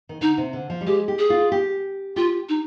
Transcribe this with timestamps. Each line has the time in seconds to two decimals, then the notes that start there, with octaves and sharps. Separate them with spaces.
0.09 D#3
0.21 D3 D#4
0.38 C3
0.53 D3
0.70 F3
0.81 G3
0.86 G#3 G4
1.08 G4
1.19 G#4
1.30 F4
1.52 G4
2.16 F4 G4
2.49 D#4